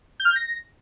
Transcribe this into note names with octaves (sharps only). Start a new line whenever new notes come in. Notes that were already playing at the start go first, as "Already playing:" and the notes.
G6
F6
G6
A#6